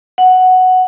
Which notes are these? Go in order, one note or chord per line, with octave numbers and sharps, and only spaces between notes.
F#5